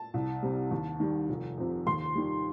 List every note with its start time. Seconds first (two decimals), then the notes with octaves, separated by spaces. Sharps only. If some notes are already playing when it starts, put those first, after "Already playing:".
Already playing: A5
0.14 C2
0.42 C3 G3
0.71 D#2
1.00 D#3 G3
1.29 F1
1.57 F2 C3
1.87 D#2 C6
2.15 D#3 G3